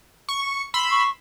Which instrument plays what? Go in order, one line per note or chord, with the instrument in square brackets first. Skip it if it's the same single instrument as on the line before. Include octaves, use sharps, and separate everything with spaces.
[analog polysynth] C#6
B5 C6 E6
[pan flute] C#6